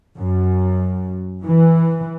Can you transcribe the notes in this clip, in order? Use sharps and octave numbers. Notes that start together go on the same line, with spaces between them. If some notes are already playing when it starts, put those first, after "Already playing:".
F#2
E3